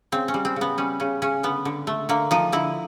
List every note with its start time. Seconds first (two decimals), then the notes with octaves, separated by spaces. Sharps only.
0.12 C#3 C4
0.28 C#4
0.34 G3
0.45 C4
0.56 C#3 B3
0.78 G3 C#4
1.00 C#3 C#4
1.22 C#3 C#4
1.43 D3 B3
1.65 D3
1.87 A3
2.09 D3 A#3
2.31 F3 D#4
2.52 D3 E4